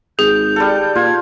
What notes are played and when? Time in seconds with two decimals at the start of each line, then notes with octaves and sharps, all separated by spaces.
0.19 G#1 G#4 G6
0.56 G3 A4
0.95 A#2 F4 G#6